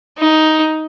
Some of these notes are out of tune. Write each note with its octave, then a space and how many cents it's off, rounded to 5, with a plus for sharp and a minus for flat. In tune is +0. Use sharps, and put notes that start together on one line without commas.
D#4 +10